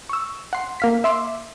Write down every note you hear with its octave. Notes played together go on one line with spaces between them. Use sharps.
C#6 E6
F#5 C6
A#3 F5 B6
E5 C6 D6 E6